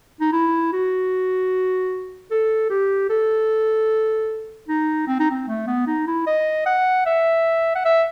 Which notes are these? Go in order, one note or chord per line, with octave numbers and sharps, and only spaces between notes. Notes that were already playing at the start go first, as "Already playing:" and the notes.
D#4
E4
F#4
A4
G4
A4
D#4
C4
D#4
C4
A3
B3
D#4
E4
D#5
F#5
E5
F#5
E5